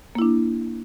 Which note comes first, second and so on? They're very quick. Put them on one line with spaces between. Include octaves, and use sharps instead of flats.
A#3 E4 D4